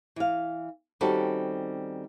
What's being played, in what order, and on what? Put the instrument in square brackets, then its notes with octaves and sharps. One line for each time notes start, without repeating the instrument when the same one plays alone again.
[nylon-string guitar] E3 F5
D#3 G3 C4 C#4 F#4 A4